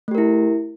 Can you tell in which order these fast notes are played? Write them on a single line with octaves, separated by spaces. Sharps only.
A3 G4 A#4 E4